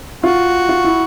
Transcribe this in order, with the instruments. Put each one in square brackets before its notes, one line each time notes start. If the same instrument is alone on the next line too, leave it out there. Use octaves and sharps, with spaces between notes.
[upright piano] F4 [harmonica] F#4
[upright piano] F4
E4